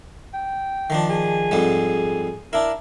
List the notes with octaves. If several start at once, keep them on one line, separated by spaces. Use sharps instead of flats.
G5
D#3 F3 D4
G#4
F2 G#2 G3
D4 E4 A#4